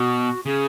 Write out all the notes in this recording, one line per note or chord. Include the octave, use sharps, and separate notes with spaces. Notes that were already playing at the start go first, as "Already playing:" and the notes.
Already playing: B2 F#4
C#3 G#4